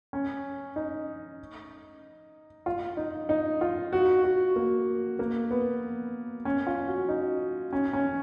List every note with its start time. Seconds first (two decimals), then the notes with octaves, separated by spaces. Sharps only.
0.13 C#4
0.76 D#4
2.66 F4
2.97 D#4
3.29 D#4
3.61 F4
3.93 F#4
4.24 F#4
4.56 A#3
5.19 A#3
5.51 B3
6.45 C#4
6.67 F4
6.87 F#4
7.09 D#4
7.73 C#4
7.93 C#4